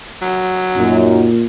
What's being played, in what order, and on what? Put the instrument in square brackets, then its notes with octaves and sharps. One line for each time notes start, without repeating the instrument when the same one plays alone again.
[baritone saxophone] F#3
[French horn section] F#2 D#4 [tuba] A#2